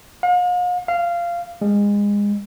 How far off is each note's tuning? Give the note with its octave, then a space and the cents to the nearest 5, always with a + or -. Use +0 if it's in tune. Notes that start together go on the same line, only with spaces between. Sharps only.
F5 +45
F5 -15
G#3 -25